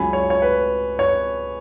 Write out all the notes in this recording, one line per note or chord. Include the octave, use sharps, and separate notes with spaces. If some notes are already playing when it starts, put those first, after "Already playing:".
Already playing: C#2 C#3 F#3 G#5 B5
C#5
C#5
B4
C#5